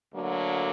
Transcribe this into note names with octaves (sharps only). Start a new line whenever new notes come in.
D2 D3 F#3 A#3